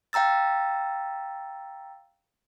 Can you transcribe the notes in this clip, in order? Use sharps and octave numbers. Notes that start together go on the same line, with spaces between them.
F5 G5 A#5 E6 A6